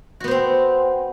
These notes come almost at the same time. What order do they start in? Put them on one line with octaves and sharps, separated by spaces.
F#4 B3 C5 C4